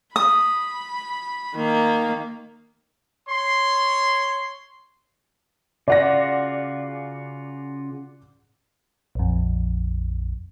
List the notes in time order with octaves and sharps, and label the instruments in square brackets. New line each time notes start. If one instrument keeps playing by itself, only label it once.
[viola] B5 [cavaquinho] D#6
[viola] D#3 A#3
[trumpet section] C#5 C6
[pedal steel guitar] C#3 F4 F#4 [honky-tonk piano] D5 F#5 A#6
[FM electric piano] A#1 F2